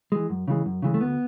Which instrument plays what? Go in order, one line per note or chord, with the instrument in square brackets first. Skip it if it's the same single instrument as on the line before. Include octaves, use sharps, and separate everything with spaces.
[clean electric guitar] E3 G#3
F#2
C#3 E3 G#3
F#2
C#3 E3 G#3
A3
D2 B3